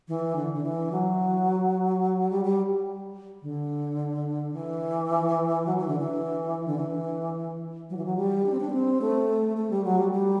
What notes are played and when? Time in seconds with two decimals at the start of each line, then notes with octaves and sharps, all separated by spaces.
0.08 E3
0.36 D3
0.54 D3
0.63 E3
0.92 F#3
2.30 G3
2.45 G3
3.42 D3
4.54 E3
5.66 F#3
5.77 E3
5.88 D3
5.99 E3
6.68 D3
6.77 E3
7.90 F#3
7.97 E3
8.06 F#3
8.17 G3
8.46 D4
8.52 C4
8.60 D4
8.70 B3
8.73 C4
9.01 A3
9.57 A3
9.71 G3
9.84 F#3
9.99 G3
10.12 G3